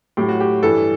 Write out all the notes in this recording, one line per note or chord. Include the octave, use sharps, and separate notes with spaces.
A2 F#3 G4
F#4
G4
G2 E3 G3 A4